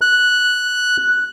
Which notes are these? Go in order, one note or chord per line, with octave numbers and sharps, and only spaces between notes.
F#6